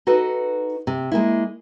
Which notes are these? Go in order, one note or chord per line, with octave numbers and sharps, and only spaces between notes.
D#4 F#4 A4 B4
C3
G#3 A#3 E4